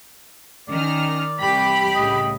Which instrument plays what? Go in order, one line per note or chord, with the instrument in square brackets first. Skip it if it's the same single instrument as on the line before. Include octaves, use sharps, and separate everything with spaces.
[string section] D#3 A#5 F6 [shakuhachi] C#4 [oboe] D5
[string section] C2 E3 [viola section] G4 B5 [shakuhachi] G5
[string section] A2 C#3 [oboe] D#5